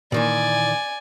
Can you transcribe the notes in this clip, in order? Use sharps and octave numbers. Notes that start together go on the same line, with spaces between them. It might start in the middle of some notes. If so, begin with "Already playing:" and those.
A#2 D#3 E3 D5 G#5